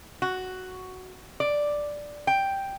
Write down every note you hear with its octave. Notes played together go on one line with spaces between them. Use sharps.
F#4
D5
G5